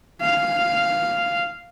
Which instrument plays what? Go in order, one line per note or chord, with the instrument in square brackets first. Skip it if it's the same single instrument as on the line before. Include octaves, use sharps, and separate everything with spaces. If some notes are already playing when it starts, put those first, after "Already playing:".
[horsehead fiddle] F5